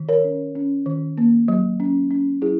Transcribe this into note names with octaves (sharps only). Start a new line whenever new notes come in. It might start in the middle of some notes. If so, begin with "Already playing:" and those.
Already playing: D#3
A#4 C#5
C#4
C#4
D#3
A#3
F#3
C#4
C#4
F#3 E4 G#4